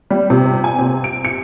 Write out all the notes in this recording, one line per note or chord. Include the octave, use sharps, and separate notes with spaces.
G3
C3
G#5
C3
D7
C#7